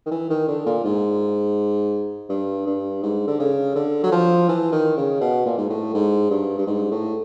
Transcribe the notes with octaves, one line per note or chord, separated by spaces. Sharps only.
D#3
E3
D#3
D3
A#2
G#2
G2
G2
G#2
D3
C#3
D3
F#3
F3
E3
D#3
C#3
B2
A#2
G#2
A2
G#2
G2
G2
G#2
A2